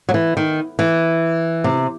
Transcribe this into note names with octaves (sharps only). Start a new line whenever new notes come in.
F#3
E3
D#3
E3
C3